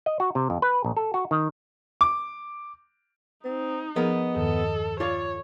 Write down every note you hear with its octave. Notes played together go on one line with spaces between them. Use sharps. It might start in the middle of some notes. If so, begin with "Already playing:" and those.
D#5
F#4
C3
F2
B4
A#1
A4
F#4
D#3
D6
C4 D#4
F3 B3 G#4 A#4 D#5
E2 G2 D#3 A4
F4 A4 C#5 D5